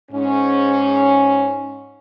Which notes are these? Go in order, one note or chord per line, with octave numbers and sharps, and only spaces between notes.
G#2 C#4